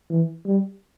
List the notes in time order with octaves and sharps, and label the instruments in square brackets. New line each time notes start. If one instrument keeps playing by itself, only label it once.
[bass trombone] E3
G3